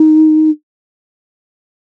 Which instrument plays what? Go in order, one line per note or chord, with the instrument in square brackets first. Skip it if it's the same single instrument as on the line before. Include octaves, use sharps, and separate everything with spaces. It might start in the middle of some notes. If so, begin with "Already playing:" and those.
Already playing: [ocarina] D#4